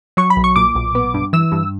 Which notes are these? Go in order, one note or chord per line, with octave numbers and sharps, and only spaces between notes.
F#3 C#6
B5
B1
C#6
A#2 D6
B1
B3
G2
E3 E6
G2